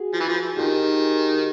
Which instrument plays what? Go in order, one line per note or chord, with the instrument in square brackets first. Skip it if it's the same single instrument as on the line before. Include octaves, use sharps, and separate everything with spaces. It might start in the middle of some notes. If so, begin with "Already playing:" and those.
Already playing: [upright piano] F#4 G#4
[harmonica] F3
E3
F3
[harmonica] D#3 [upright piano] F4 G4